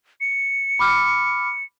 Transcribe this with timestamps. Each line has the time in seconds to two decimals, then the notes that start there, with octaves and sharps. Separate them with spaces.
0.21 C#7
0.79 B5 D6 F6